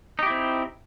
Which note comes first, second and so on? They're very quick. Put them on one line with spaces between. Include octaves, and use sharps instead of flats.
D#4 G4 E4 C4